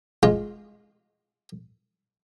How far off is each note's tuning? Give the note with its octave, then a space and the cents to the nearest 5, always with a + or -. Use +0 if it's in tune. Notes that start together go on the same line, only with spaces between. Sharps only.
G#3 +5 F4 +0